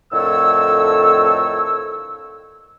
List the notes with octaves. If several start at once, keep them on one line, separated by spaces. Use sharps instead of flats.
F2 A2 D3 D#3 C#5 E6